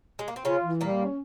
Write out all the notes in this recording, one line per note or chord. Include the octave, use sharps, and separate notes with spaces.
G#3
A#3
C4
C#3 C#4 F4
E3
A#2 G3 A#3
C#4